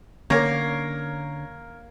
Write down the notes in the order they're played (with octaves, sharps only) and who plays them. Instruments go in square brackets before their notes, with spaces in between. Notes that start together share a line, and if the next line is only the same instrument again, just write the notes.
[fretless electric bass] D3 C#4 [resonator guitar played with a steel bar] A#3 [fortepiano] A#4 C#5